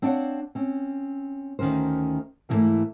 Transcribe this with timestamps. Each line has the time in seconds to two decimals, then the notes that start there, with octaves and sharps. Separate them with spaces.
0.02 C4 D4 C#5 D5 F5 F#5
0.55 C4 C#4
1.59 D2 D#3 C#4 A#4 C5
2.49 G#2 E3 F3 G3 A3 A#3